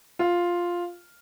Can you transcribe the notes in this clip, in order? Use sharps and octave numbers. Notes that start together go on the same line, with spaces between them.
F4